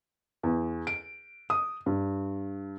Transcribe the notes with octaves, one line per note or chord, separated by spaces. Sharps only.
E2
D7
D#6
G2